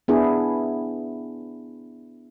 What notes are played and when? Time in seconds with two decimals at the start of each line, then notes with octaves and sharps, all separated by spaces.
0.08 B3 D4 E4 G#4